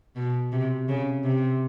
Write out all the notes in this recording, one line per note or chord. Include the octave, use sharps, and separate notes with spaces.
B2
C3
C#3
C3